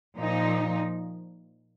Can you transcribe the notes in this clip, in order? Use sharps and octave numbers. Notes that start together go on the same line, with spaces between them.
A#2 F3 D#4